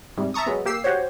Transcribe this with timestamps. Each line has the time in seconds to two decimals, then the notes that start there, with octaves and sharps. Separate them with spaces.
0.17 G#2 C3 G3
0.34 E5 A5 A#5 C#6 D#6
0.46 F#3 G#3 B3
0.65 A#3 G4 E6 C7
0.84 F#4 G4 C5 C#5